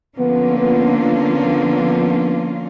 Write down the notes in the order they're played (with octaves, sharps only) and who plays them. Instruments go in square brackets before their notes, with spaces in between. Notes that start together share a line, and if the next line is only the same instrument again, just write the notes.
[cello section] D3 F3 A#3 C#4 F4 [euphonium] B3
[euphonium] B3
B3